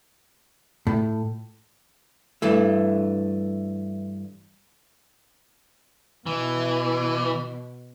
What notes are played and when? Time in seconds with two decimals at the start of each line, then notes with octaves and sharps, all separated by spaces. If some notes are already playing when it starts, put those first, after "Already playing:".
0.87 A2
2.42 G2 E3 A3
6.26 B2 E3